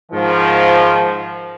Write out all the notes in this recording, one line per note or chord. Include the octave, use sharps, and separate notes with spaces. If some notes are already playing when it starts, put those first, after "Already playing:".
G#2 D#3 F3